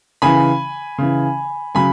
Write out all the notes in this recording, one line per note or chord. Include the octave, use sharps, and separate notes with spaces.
C#3 E3 G#5 B5
C#3 E3
C#3 F#3 G#5 B5